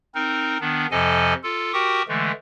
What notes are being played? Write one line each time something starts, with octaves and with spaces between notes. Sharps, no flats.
C4 D#4 A#4
D#3 B3 D4
F2 C3 F3 A4 D#5 G#5
F4 A4
F#4 G4 A#4 G5 C#6 D#6
D3 E3 G#3 A3